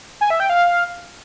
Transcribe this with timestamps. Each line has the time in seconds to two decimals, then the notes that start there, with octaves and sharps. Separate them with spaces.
0.21 G#5
0.30 E5
0.40 G5
0.50 F5